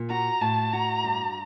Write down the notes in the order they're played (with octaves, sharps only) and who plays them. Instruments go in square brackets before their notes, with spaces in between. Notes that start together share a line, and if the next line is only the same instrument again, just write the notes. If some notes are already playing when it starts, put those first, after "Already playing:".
Already playing: [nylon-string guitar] A#2
[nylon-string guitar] F#4 [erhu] A#5
[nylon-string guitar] A2 [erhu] A5
[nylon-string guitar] F#4 [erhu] A#5
[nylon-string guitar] G2